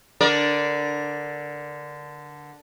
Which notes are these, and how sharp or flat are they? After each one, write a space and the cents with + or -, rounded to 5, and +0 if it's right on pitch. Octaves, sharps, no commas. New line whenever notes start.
D3 +0 A#4 +20 D5 +0